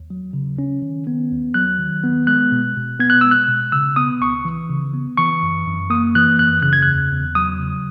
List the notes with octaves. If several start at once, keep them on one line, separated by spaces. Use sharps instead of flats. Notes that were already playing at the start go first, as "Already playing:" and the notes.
Already playing: D#2
F#3
C#3
C#4
D#3
B3
D#2
F#3 F#6
D#3
B3
G#3 F#6
B2
B2
B3 G#6
F#6
G#3 E6
F#6
B2
C#3 E6
B3 D#6
C#2 C#6
E3
C#3
B3
E3 C#6
F#2
F#2
A#3 D#6
E3 F#6
F#2 F#6
C#3 F#6
G#6
E2 F#6
E2
F#3 D#6
C#3